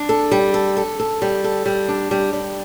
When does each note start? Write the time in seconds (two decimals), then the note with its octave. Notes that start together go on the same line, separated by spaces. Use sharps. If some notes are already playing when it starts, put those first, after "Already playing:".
Already playing: D4
0.09 A4
0.32 G3
0.54 A4
0.77 A4
1.00 A4
1.22 G3
1.44 A4
1.66 G3
1.88 D4
2.11 G3
2.33 G3